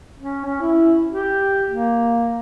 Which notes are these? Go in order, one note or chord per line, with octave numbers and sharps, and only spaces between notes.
C#4
C#4
E4
G4
A#3